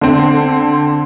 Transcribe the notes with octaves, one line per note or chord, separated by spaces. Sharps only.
D3 C4